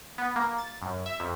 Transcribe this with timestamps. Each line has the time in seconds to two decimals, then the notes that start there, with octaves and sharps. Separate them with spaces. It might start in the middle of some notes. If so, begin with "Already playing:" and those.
0.18 B3
0.36 A#3
0.58 A6
0.82 F#2
1.06 E5
1.20 F2